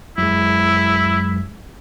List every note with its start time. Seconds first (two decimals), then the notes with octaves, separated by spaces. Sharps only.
0.18 F#2 G#3 E4